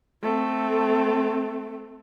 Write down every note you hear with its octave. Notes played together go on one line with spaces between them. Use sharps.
A3 C4